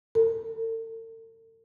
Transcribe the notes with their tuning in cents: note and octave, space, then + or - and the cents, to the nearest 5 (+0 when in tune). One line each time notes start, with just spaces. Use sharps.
A4 +45